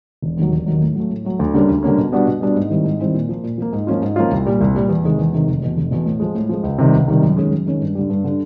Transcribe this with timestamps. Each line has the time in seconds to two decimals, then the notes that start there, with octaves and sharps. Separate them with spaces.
0.22 E1
0.37 D#2 D#3 F#3
0.52 E1
0.66 D#2 D#3 F#3
0.81 A2
0.96 F#3 A3
1.10 A2
1.25 F#3 A3
1.39 D2
1.54 D3 G3 A#3 C#4
1.69 D2
1.83 D3 G3 A#3 C#4
1.98 B2
2.12 G3 B3 D4 F#4
2.27 B2
2.41 G3 B3 D4 F#4
2.56 G#2
2.70 D#3 G3 C4 E4
2.84 G#2
3.00 D#3 G3 C4 E4
3.14 A#2
3.29 F3 A#3
3.43 A#2
3.58 F3 A#3
3.73 G#2
3.87 F3 A#3 C#4 F4
4.02 G#2
4.16 F3 A#3 C#4 F4
4.31 C2
4.45 A#2 G3
4.60 C2
4.74 A#2 G3
4.89 E2
5.03 C3 D#3 G#3
5.18 E2
5.33 C3 D#3 G#3
5.47 F1
5.62 E2 B2
5.77 F1
5.91 E2 B2
6.05 A2
6.20 F3 G#3
6.35 A2
6.49 F3 G#3
6.63 C#2
6.78 C3 D#3 G3
6.93 C#2
7.08 C3 D#3 G3
7.22 F#2
7.37 D#3 G#3 C#4
7.51 F#2
7.66 D#3 G#3 C#4
7.80 G2
7.95 D3 G3
8.10 G2
8.24 D3 G3